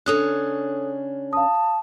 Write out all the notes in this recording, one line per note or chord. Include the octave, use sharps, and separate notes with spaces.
C#3 C#4 D4 A4 D#6 F#6
F5 A5 D#6